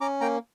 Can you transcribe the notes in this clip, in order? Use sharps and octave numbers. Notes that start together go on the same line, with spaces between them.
C#4 A#5 D6
A#3 G5 A#5